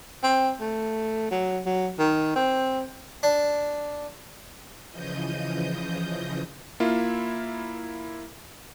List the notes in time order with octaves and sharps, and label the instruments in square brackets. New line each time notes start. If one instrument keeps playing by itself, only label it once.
[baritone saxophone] C4
A3
F#3
F#3
D#3
C4
[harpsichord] D4
[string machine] C#3 E3 F3 D#5 D#6 G6
[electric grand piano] A#3 E4 F4